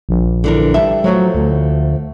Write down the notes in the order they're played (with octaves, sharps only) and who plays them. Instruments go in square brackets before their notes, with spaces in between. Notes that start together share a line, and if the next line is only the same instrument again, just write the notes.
[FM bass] A#1
[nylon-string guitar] D3 E3 A#4
G3 A4 E5
[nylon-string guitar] F3 A3 F#4 [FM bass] F#3
[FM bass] D2